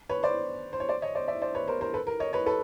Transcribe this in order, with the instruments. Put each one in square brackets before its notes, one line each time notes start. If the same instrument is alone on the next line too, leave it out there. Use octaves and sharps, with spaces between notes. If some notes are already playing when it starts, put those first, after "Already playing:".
[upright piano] B4 C#5
C5 D5
C5
C#5
C5 D5
C#5 D#5
C5 D5
D5 E5
C5 D5
B4 C#5
A#4 C5
A#4 C5
A4 B4
A#4
C#5 D#5
B4 C#5
A4 B4